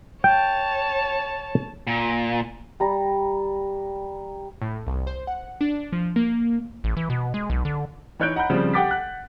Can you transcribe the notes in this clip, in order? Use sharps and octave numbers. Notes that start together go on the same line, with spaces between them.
C#5 G5 A5
A#2
G3 A#5
A2
C2
C5
F#5
D4
F3
A#3
A1
E3
B2
G#3
B1
D3
E3 D#4 C#5 F#6 G6 D7
D#5 F#5 A#5 B5 G6
C#3 F3 G3 C4
G4 F#5 G5 D6 A6 B6
F#5 F#6